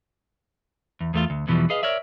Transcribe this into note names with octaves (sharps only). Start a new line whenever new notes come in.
E2
E2 A3 F4
D2
E2 B2 E3 F3 G3
G#4 B4 D#5 F5
A#4 C#5 D5 E5